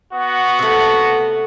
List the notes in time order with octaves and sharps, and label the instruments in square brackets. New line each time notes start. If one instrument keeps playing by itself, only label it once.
[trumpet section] B3 F#4
[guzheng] C3 A3